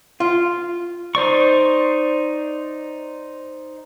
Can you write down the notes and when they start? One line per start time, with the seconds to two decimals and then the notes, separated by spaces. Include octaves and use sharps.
0.20 F4
1.15 D#4 C5 D5 C#6